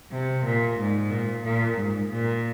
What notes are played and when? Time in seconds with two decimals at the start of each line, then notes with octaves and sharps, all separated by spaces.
0.11 C3
0.44 A#2
0.78 G#2
1.10 A#2
1.43 A#2
1.77 G#2
2.09 A#2